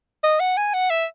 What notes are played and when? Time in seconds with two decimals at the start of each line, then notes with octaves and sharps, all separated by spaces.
0.24 D#5
0.40 F#5
0.57 G#5
0.74 F#5
0.90 E5